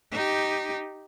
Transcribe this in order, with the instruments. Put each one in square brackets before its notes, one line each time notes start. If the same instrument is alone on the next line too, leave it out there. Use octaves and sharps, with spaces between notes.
[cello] D#4 G4